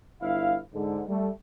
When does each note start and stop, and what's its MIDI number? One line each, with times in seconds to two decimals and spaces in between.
0.22 0.57 31
0.22 0.57 64
0.22 0.57 77
0.73 1.01 44
0.73 1.01 50
1.08 1.29 55
1.08 1.29 57